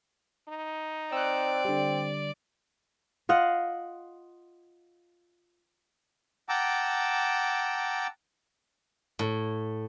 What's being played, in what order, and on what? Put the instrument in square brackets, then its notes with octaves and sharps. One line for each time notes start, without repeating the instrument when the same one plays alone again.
[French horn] D#4
[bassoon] C4 [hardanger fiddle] D5 [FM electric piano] E6 F#6
[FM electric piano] D3 G3
[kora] F4 D#5 F5 F#5
[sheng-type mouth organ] F#5 G5 A5 A#5 D6 E6
[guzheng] A2